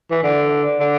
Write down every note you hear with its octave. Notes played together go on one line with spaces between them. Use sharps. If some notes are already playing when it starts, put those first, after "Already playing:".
E3
D3
D3